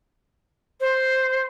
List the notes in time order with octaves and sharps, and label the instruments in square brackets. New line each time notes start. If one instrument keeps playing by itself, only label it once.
[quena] C5